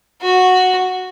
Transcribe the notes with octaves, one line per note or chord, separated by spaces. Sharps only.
F#4